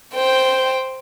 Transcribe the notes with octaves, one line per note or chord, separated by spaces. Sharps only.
C5 G5